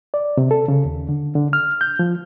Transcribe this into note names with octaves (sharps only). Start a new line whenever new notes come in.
D5
C3
A4
C#3
D#2
D3
D3
F6
G6
F3